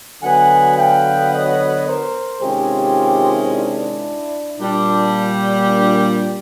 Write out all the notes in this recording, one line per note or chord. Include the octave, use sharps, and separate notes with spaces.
D3 F#3 B3 F#5 G#5
F5 G5
C#5 D#5
A#4 C5
C3 D#3 G#3 C#4 F4 G4
D4 E4
A#2 G3 A#3 D4
D4